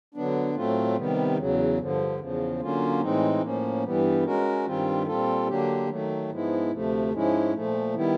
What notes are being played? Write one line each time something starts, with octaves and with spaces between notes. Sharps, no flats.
D3 F#3 B3 D4
A2 F#3 A3 C4 F4
C3 D#3 G3 B3
E2 C#3 F#3
G2 D3 F3
E2 C#3 F3
D3 F#3 A#3 C#4 F4
A2 E3 G#3 C4 D#4
A2 F3 A#3 C#4
G2 E3 G3 B3
G#3 C#4 F#4 A#4
G2 D#3 G3 C4 F4
A#2 G3 C4 F4 A4
D3 F#3 A#3 D4 G4
D#3 F#3 A3
G#2 F3 G#3 B3 E4
D2 C3 F3 A3
G#2 F3 G#3 C#4 E4
A#2 F3 A3
D#3 G3 B3 E4